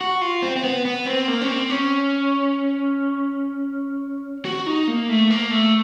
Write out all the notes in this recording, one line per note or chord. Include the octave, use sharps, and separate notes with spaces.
F#4
F4
C4
C4
B3
B3
C4
A#3
C#4
C4
C#4
F#4
D#4
A#3
A3
A#3
A3